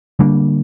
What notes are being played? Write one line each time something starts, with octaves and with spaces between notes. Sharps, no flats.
D3 G3 A#3 D4